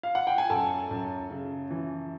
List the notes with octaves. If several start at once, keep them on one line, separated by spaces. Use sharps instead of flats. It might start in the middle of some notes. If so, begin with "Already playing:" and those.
F5
F#5
G5
G#5
F#2 A4 A5
F#2
C#3
E3